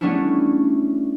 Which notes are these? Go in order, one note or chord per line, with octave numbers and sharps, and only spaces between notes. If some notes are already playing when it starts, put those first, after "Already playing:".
G3 A3 B3 C#4 D4 E4